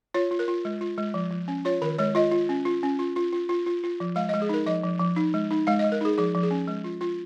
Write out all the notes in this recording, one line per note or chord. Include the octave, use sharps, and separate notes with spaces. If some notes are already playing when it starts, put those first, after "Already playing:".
F4 C#5
F4
A#4
F4
G#3
F4
G#3
F3
F3
C#4
F4 C#5
D#3 A#4
G#3 C#5
F4 D#5
F4
C#4
F4
C#4
F4
F4
F4
F4
F4
F4
F3
G#3 F5
G#3 D#5
G#4
D#4 A#4
F3 D#5
F3
F3
D#4
G#3
D#4
G#3 F5
G#3 D#5
A#4
D#4 G#4
F3 G#4
F3
G#4
C#4
G#3
F4
F4